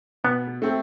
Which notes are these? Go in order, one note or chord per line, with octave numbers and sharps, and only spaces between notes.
B2 B3
A3 C4